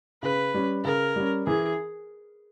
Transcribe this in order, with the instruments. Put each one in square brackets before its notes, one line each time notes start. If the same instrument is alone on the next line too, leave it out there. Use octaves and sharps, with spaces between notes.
[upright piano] C#3 [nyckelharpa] B4
[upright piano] G3 C#4
[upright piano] C#3 [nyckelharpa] A#4
[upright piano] G3 C#4
[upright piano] E3 [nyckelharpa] G#4